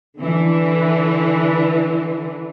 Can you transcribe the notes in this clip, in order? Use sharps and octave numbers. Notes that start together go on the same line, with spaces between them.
D3 E3